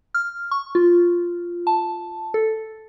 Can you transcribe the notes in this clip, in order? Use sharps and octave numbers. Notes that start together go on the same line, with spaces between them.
F6
C#6
F4
A5
A4